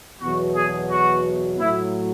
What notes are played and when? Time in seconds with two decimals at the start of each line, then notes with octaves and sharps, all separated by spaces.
0.21 E2 B2 F#3 F#4
0.56 G#4
0.91 F#4
1.59 A2 F#3 E4